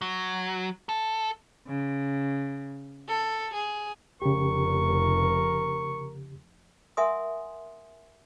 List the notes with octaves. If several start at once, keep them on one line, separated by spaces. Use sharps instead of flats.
F#3
A4
C#3
A4
G#4
F1 C#3 G4 A#4 C#6
A#4 E5 F#5 G#5 C6 D#6